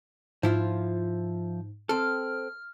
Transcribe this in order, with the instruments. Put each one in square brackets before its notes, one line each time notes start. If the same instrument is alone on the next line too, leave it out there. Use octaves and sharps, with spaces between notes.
[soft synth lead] G#2 [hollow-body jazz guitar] F3 E4 F4
[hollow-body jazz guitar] C4 A4 [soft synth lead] F6